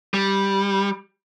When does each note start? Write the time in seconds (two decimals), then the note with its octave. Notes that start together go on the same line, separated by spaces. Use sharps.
0.14 G3